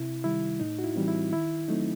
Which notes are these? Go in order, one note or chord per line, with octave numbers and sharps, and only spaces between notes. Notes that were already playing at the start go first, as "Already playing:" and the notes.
Already playing: C3 E4
D#3 G3 E4
A2 D#4
F#4
E4
E3 G3 C4
E4
D#3 E4
F#3 A3 C4 D#4